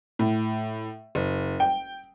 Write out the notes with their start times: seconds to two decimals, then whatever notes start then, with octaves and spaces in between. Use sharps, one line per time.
0.19 A2
1.15 F#1
1.60 G5